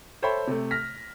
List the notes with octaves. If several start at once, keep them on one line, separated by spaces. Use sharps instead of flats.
A4 C5 C#5 E5 G5 B5
C3 A3
F6 A#6 B6